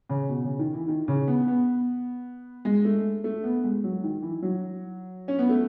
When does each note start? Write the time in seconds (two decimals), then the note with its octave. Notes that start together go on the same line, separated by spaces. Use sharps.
0.09 C#3
0.29 B2
0.44 C#3
0.59 D#3
0.73 E3
0.88 D#3
1.08 C#3
1.28 B3
1.48 B3
2.65 G#3
2.85 A3
3.24 A3
3.44 B3
3.64 G#3
3.84 F#3
4.04 D#3
4.22 E3
4.42 F#3
5.28 C#4
5.39 B3
5.49 A3